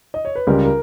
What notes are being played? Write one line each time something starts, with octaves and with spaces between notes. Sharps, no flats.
D#5
C#5
B4
C#2 C#3 G3 A#4
A#4